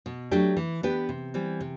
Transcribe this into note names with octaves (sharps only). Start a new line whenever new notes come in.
B2
F#3 A3 D4 G4
E3
B3 D4 G4 B4
C3
E3 G3 C4
C3